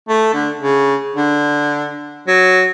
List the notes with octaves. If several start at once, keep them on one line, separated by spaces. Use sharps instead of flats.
A3
D3
C#3
D3
F#3